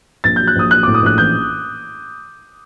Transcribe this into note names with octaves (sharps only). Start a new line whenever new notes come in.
A#1 A6
G6
F#3
F#6
A#1 D#6
F#3 F#6
D6
A2
D#6
A#1 F#6
A1 G6